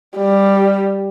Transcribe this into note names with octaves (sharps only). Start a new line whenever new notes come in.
G3